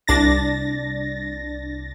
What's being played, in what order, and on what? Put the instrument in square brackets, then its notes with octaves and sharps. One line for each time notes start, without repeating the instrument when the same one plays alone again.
[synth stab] C2 D4 A6 A#6